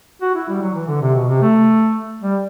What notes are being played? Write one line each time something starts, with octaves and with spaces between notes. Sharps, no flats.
F#4
E4
G3
F#3
E3
D3
C3
B2
C3
A3
G3